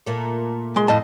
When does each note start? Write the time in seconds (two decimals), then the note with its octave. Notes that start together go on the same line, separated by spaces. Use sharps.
0.06 A#2 A3
0.76 G#3 C6
0.88 F2 A2 D#5 A5